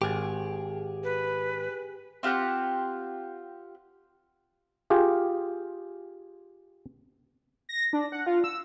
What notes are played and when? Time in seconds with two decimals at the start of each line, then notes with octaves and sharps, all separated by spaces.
0.02 G#1 G4 G#4
1.04 B4
2.23 C4 F4 G4 F#5
4.90 F4 G4 G#4
7.69 A#6
7.93 D4
8.12 F#5
8.27 F4
8.44 E6